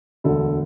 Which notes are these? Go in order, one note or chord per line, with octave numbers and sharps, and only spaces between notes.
E1 D2 D3 A4